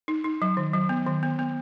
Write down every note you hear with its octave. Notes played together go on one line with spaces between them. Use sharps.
D#4
D#4
F#3
D#3
F#3
B3
D#3
B3
B3